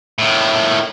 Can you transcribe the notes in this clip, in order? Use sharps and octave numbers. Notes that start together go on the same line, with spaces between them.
A2 D#3